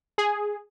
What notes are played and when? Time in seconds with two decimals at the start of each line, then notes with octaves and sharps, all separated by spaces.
0.18 G#4